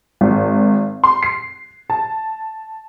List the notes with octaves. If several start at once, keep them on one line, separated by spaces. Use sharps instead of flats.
G#1
C6
C7
A5